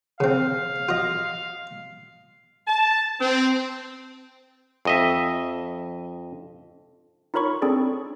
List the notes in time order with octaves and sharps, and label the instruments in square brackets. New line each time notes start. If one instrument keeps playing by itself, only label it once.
[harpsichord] C#3 C4 [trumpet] F5
[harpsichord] F4 D#5
[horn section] A5
C4
[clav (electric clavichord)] F2 D#5 E5
[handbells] D#4 F4 A#4 C#5 B5 C#6
C4 D4 G#4 A4 D5